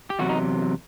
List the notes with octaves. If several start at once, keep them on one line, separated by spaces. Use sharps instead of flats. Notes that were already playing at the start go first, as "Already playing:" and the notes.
G4
E2 C3 F#3 F#4
D#4